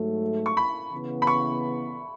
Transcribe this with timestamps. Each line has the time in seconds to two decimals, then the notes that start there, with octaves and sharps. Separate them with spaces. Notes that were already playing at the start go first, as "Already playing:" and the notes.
Already playing: G#2 F#3 A3
0.46 C#6
0.57 B5
0.92 C#3 E3 B3
1.22 B5
1.27 C#6